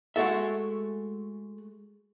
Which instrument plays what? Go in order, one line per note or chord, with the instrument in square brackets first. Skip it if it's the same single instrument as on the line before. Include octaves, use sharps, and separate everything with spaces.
[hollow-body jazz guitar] G#3 A3 F#4 A4 E5